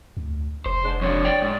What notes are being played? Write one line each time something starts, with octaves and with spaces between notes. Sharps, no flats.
D2
F1 C5
G#2 G#3 D4
F2 D4 C#5
D5 G5
G#2